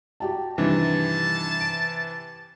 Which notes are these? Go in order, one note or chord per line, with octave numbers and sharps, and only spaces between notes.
F#4 G4 A5
G2 C3 D#3 E3 A5
D7